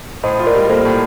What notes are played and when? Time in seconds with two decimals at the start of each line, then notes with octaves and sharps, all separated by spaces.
0.23 A2 C5 D#5
0.39 F4
0.47 A#4 D5
0.55 G3
0.69 A#3 A4 C5
0.85 A2